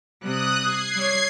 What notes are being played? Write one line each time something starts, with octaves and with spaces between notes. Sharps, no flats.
C3 G3 D#6 F#6
G#6 C7
G3 C#5